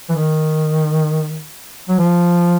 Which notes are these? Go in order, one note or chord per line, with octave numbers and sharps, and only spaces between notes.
E3
D#3
F#3
F3